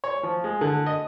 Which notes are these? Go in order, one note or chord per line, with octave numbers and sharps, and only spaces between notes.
C#5
F3
G#3
D3
D#5